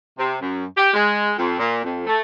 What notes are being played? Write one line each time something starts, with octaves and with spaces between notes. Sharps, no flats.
C3
F#2
G4
G#3
F2
A#2
F2
A3